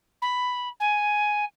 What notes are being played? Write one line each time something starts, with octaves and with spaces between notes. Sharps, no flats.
B5
G#5